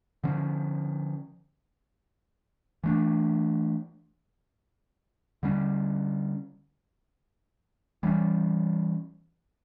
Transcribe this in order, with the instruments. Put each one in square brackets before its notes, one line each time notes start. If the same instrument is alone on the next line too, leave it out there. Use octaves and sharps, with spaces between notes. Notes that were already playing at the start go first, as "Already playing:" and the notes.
[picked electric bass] D3 F3 C#4
E3 A3 D4
D3 G3 C#4
E3 G3 A#3 C#4